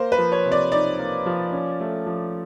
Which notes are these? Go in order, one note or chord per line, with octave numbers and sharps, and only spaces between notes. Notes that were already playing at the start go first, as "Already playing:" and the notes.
Already playing: A#3 C5
B4
F3
C#5
C3
D5
D#4 D5
A#3
F3
C#4
A3
F3